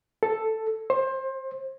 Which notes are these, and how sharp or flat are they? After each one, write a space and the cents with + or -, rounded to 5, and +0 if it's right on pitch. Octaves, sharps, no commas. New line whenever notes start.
A4 +5
C5 +25